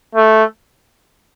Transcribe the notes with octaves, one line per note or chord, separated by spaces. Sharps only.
A3